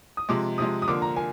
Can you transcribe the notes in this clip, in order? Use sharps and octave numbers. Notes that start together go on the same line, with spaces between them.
D#6
C3 F3 G#3 D6
C3 F3 G#3 D#6
D#6
D3 F3 A#3 D6
A#5
A#3 G#5